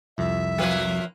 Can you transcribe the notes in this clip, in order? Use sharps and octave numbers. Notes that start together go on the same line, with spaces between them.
C2 F2 E5
F3 A#3 B4